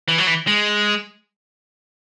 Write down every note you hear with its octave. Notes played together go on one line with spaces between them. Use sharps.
E3
F#3
E3
G#3